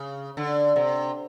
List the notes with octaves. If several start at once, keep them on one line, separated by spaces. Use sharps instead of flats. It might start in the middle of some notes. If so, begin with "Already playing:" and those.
Already playing: C#3
D3
C3